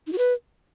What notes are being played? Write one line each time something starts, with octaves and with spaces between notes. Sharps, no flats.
D#4
F#4
B4